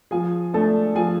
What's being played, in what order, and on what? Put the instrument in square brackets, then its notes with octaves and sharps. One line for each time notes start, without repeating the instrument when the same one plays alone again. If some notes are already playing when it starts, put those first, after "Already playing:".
[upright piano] F3 [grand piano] G#4 G#5
[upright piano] A3 D4 [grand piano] A4 A5
[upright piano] F3 [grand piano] G#4 G#5